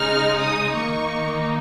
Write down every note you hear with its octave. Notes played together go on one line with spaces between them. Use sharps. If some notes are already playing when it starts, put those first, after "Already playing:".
Already playing: C#3 G#3 D#4 F6
D#6
D#3 A#3 D#4 C#6